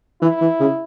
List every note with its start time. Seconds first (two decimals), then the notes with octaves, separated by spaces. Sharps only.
0.22 E3 E4
0.41 E3
0.60 C#3